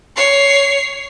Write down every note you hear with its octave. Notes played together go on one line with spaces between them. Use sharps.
C#5 C7